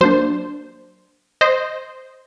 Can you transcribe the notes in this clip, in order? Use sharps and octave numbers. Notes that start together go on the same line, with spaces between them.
F#3 A#3 D4 C5
C5 D#5